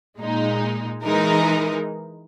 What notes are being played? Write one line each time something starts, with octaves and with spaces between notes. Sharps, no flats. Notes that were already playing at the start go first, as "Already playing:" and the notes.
A#2 G#3 D#4
E3 G#3 D#4 A#4